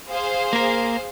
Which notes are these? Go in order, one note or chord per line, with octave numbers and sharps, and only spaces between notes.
G#4 C5 F5
A#3 A#4